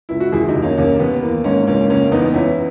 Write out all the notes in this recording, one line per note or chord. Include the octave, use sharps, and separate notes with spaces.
C#2 E4
F#4
D#2 E4 G#4
D#4 F#4
D#2
A#3 C#4
D#2 A#3 C#4
D#2 B3
E3 A#3
G#2 A#3 C#4
C#2 A#3 C#4
C#2 A#3 C#4
E2 B3 D#4
E2 C#4 E4